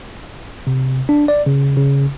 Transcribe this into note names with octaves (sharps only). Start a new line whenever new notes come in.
C3
D4
D5
C#3
C#3